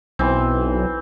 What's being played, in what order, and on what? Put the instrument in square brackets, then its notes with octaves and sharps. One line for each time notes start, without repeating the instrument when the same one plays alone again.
[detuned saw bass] B1 [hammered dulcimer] E3 C4